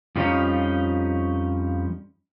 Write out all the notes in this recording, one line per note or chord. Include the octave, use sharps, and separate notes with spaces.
F2 F3 G3 C#4 D#4